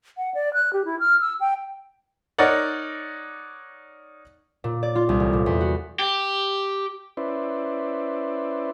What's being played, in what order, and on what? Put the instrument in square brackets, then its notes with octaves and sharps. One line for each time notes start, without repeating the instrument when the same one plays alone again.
[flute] F#5
D5
F#6
G4
E4
F6
E6
G5
[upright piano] D#4 A#4 C#5 D5 F#5
[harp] A#2
D5
F4
C2
A1
A#2
E2
F#4
[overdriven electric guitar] G4
[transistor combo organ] C#4 E4 B4 C5 D5